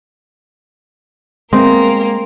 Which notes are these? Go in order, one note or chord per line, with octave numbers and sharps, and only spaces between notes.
G#3 A#3 C4